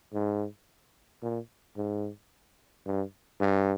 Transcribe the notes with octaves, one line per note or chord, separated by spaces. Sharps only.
G#2
A#2
G#2
G2
G2